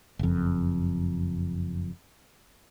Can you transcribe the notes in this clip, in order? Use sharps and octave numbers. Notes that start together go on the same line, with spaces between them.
F#1 F2